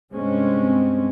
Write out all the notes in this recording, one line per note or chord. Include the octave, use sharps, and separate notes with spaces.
G2 C3 G#3 C4 C#4